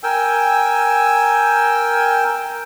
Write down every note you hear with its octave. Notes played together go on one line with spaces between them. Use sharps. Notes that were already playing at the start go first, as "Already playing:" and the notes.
A#4 G5 G#5 E6